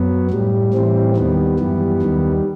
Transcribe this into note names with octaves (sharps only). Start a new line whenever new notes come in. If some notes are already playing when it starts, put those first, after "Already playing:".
Already playing: F#2 F#3 B3
A2 G3
A2 E3 G3 C4
D#2 D#3 G3 B3
F#2 E3 G3
D#2 D#3 G3